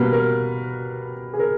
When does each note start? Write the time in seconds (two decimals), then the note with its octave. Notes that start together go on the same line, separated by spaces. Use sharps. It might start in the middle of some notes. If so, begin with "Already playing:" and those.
Already playing: B2 G3 A#3 B4
0.13 A#4
1.34 G#4
1.39 A#4